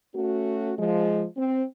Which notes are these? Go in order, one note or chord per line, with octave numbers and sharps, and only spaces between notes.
A3 C#4 F#4
F3 G#3
C4